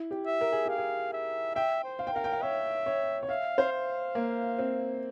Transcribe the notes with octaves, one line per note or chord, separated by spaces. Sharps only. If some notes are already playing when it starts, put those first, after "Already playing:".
Already playing: E4
G4
E5
A#4
G#4
G4 F5
G#4
E5
E5 G5
C5
F5
G5
A#4 F5
G5
F5
C#5 E5
C#5
C#5
E5 F5
C5
F5
A#3
C4